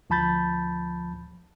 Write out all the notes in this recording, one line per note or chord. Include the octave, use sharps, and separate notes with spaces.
D2 F3 A5 B5 G6 A6